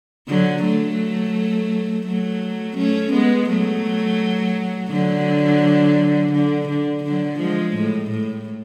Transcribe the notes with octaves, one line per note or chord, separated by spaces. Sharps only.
D3 F#3
F#3 A3
F#3 A3
A3 C#4
G#3 B3
F#3 A3
D3 F#3
D3
D3
D3 F#3
F3 G#3
A2
A2